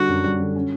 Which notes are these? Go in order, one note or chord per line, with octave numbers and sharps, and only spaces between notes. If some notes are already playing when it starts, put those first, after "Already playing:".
Already playing: D3 G3 D4 F#4
F#2
G3
D3
C#4